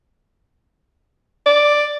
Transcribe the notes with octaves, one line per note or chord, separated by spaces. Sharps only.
D5